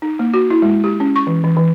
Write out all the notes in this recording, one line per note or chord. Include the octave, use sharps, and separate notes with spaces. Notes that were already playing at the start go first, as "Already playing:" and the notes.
D#4
A#3
F#4
E4
G#3
G4
C#4
C#6
E3
E3
E3